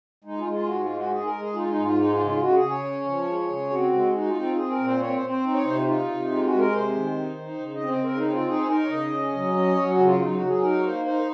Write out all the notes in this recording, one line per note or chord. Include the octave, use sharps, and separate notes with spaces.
G#3 D#4
F4
G#3
F4
G#2 F#4
F4
G#3
F#4
G#3 G#4
A#4
G#3
G#4
D#4 F4
D#4
G#2
F4
G#3 D#4
F4
C#3
F4
C#3 F#4
G#4
C#3
C#5
C#4
F3
G#3
C#3
C4 F#4
G#3
D#4 F#4
F4
C4
F4
C4 G#4
A#4
A#2
C5
C4 C#5
C5
C4
C5
D#4
C#5
C3 C5
F4
D#4 F4
C3
G#3 F4
F#4
G#3
A#4
C3 C5
D#3
D#4
D#4
C#3
D#5
C4
C5
C#3 A#4
D#4
C4
F4
D#4 G#4
C5
D#4 A#4
C#5
C#3 D#5
C#4
F#3
C#4
F#3 C#5
F#4
C#3
F4
F#3 D#4
F#4
F#3
G#4
D#4 A#4
C#5
A#3 C5
D#4 C5